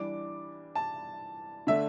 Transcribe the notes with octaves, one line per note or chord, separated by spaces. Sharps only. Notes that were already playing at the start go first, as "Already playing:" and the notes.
Already playing: E3 G3 D4 D6
A5
D3 A3 D4 E5